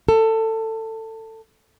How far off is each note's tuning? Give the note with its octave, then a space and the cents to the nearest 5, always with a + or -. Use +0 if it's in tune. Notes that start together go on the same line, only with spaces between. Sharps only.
A4 +20